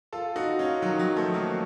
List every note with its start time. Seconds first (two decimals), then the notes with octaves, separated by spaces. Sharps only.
0.13 F4 A4
0.36 D#4 F#4
0.59 C#4 F4
0.82 D#3 F#3
0.99 D#3 F#3
1.17 F3 A3
1.34 F#3 A#3